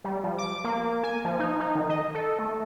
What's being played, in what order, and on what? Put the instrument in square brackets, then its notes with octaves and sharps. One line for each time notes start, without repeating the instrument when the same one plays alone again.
[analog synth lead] G3
F3
D6
A#3
G#5
F3
D#4
D#4
D#3
D#5
A4
A3